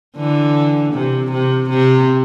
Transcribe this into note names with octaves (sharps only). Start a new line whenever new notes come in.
D3 E3
C3
C3
C3